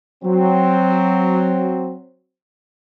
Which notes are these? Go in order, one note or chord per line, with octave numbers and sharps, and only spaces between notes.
F#3 C4